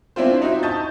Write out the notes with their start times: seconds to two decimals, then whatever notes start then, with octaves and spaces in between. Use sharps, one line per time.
0.16 C4 D4 E4 F4 C5
0.42 D#4 F#4 E5
0.63 A5 C#6 D#6 G6 A6